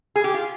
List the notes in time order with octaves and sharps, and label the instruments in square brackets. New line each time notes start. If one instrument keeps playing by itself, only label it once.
[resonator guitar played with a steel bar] G#4
G4
F4